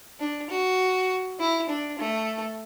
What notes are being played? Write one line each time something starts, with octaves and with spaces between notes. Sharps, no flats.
D4
F#4
E4
D4
A3